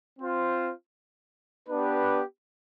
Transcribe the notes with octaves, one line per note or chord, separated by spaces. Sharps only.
C4 F4 C5
B3 D4 G4 B4